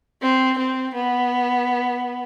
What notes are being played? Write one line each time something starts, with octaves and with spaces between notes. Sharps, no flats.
C4
C4
B3